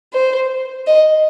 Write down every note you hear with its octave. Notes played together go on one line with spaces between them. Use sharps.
C5
D#5